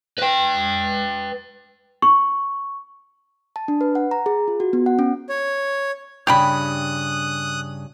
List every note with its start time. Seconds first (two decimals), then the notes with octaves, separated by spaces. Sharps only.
0.18 B4 G5
2.02 C#6
3.56 A5
3.68 D4
3.81 B4
3.95 F#5
4.11 A#5
4.26 G#4
4.48 F4
4.60 F#4
4.73 B3
4.86 F#5
4.99 C#4
5.29 C#5
6.27 G2 C#3 G4 G5 B5 D#6 F#6